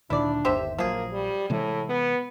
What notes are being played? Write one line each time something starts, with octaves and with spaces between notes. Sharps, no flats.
D2 A#2 D#3 D4 E4 D5
G1 D#2 G4 C5 E5
A#1 F3 F#3 A#3 G#4
G3
A2 C3 E3 G#3
B3